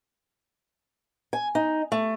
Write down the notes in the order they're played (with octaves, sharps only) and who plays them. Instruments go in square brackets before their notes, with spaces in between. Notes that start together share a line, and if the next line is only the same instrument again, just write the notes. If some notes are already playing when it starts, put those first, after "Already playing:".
[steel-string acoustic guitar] G#5
D#4
A3